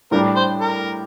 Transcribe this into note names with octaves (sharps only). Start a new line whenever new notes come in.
A2 G3 D4 G4 A#4
C5
A#4